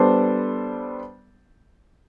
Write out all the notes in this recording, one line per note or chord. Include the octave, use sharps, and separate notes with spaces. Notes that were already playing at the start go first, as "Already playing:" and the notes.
Already playing: G3 B3 D4 A4 C5